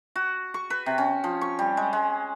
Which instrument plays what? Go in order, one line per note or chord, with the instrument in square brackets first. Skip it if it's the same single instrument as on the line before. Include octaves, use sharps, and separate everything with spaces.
[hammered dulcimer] F#4
C#6
B4
C3
C#4
F3
C#6
G3
G#3
G#3